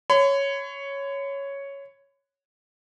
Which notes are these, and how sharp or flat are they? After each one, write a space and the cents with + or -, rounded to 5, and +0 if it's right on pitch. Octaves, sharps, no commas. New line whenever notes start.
C#5 +0 B5 +45